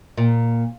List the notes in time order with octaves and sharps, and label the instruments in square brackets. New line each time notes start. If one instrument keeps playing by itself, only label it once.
[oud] A#2